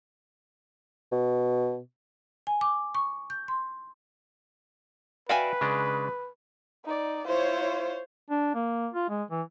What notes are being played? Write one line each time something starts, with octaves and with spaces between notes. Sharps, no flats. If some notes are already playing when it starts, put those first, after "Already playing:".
B2
G#5
D6
C#6
G6
C6
F#4 B4 D5 E5 F5 G5 G#5
C#3 G#3 D4
D#4 D5
E4 F4 C5 C#5
D4
A#3
F4
G#3
E3